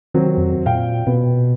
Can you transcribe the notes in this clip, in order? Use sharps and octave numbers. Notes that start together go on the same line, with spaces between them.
C3 D#3 F#3 C4
F2
A#2 F5 G5
B2 B3